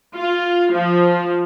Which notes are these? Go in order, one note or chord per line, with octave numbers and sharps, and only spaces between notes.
F4
F3